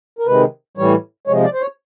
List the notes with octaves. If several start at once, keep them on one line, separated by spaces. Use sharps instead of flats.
A#4
C3 D#3 G#3 B4
A2 E3 G3 C#5
C3 F3 G#3 C#5
D5
C5
C#5